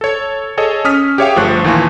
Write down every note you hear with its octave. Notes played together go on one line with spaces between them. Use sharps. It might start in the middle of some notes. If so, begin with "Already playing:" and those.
A4 C#5
G#4 A4 C#5 D#5
C#4 D#6 F6 B6
G4 G#4 C#5 E5 F5 G5
G1 F3 A3 C#6 F#6
D#2 A#2 E3 F4 G#5 C#6